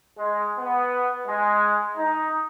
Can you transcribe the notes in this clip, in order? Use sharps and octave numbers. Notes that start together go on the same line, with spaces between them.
G#3
B3
G#3
D#4